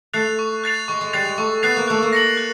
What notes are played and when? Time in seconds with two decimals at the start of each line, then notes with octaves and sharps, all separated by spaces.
0.13 A3 F#6 A6 C7 F7
0.39 C#6
0.64 F#6 A6 C7 F7
0.88 G#3 C#6
1.01 G#3
1.13 G3 F#6 A6 C7 F7
1.25 G#3
1.38 A3 C#6
1.63 B3 F#6 A6 C7 F7
1.77 A#3
1.88 A3 F#6
2.03 A#3
2.13 A#6 C#7 F#7
2.37 F#6